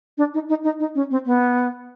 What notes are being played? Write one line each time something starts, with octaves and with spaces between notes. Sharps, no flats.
D4
D#4
D#4
D#4
D#4
C#4
C4
B3